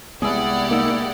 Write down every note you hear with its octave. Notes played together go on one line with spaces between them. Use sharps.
C2 G#3 B3 E4 G4 G#4 D5 F#5
A#3 D#4 E6